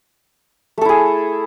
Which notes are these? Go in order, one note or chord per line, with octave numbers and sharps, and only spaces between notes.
A3 E4 G#4 A4